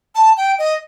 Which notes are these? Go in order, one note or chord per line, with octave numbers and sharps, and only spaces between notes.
A5
G5
D#5